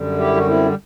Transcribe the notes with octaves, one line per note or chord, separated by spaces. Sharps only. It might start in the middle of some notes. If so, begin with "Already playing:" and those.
Already playing: F#2 D3 G3
E4 G4
F#4
C4 E4